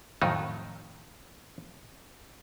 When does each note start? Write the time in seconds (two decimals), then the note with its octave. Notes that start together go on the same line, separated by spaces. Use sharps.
0.22 F2 A2 D#3 F#3 D#4